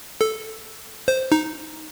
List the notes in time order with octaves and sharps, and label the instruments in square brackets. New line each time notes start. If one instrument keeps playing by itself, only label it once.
[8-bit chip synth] A4
C5
D#4